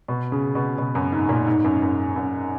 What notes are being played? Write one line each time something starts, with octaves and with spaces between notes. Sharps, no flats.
B2
C#3
B2
B2
F#2
G#2
A#2
G#2
F#2
F#2
F#2